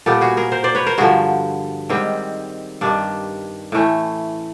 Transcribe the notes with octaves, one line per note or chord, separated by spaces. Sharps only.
A#2 G3 B3 G4 A4
F#4 G#4
G#4 A#4
A#4 C5
C5 D5
B4 C#5
A#4 C5
G2 D3 F3 F#4 G#4
G#2 D#3 G3 C4
G2 D#3 G3 D4
A2 E3 A3 C#4